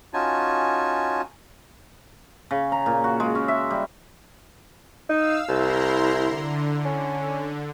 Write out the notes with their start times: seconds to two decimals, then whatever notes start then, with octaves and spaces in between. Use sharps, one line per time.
0.13 C#4 D#4 F4 F#4 G#5 A5
2.51 C#3
2.72 A#5
2.86 A#2
3.04 F#4
3.20 G#3
3.35 C#4
3.48 E5
3.70 G3
5.09 D#4 F5 E6
5.49 C2 E4 A#5 C6
6.25 D3
6.85 C#4